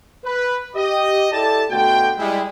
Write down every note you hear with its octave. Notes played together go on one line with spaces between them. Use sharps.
B4
G4 D#5
E4 G4 A4 D5 A5
B2 D3 A3 F#4 G5
G3 G#3 E4